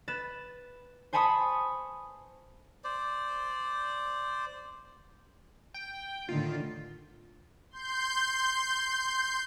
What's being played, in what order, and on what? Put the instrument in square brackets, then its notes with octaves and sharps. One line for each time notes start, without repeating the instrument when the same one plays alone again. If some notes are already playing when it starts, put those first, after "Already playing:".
[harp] B4 A6 E7
C5 G#5 A5 B5 C#6 D#6
[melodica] C5 D5
[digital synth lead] G5
[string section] A2 D3 D#3 [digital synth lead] F4
[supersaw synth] C6 G6